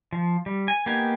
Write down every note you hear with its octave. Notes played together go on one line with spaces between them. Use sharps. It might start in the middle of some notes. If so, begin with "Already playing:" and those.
F3
G3
G#5
A#3 B3 D#4 G4 G#5